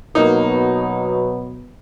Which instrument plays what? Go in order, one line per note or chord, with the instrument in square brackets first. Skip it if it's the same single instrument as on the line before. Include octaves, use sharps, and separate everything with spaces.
[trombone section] B2 F#3 B3 [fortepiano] A#3 D#4